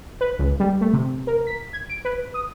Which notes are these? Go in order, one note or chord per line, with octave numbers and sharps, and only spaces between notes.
B4
C#2
G3
A3
C3
A#4
B6
G#6
D7
B4
D#6